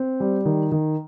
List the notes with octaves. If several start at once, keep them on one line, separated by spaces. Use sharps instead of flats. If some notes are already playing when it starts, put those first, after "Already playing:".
Already playing: C4
G3
D#3
D#3